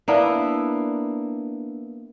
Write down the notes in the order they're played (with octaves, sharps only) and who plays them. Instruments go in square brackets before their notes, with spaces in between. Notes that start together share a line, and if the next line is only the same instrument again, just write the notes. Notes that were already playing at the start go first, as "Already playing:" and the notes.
[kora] A#3 B3 D4 E4